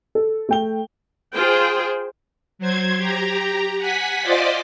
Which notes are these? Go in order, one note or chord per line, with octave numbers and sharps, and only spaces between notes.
A4
A3 G5 G7
F4 G#4 C5 G5
F#3 C5 G#6
G4 A#5
F#5 G#5 B6
F4 C5 D5 D#5 C6 D6